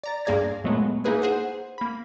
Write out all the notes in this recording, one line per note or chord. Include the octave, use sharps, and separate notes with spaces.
D5 A#5 A6
G2 A#3 G#4 D5 G#6 A#6
A#2 F#3 G#3 A3 B3
A#3 D#4 E4 G#4 B4 G#5
G#4 C5 F#5
A#3 B5